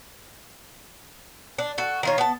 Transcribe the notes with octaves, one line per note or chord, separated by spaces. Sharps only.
D4
F#4 A4
D#3 F4 C#5
B3 A5